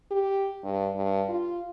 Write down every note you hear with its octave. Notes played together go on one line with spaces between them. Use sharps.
G4
G2
G2
F4